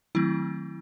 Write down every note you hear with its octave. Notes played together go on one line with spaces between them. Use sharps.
D#3 F#3 A3 C4 E4